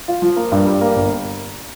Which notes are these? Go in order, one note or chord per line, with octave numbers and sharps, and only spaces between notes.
F4
F3
A#3
G2
G3
A#3
G1